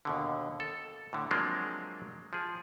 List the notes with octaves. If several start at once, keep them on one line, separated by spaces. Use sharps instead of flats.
D#2 B2 D3
A4
A2 D3
F3 F#3 G#3 A#3 C4 D4
F3 G#4